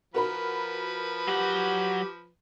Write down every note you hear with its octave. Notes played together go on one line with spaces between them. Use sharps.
F3 F#4 A#4 B4 B5
F#3 G4 F#5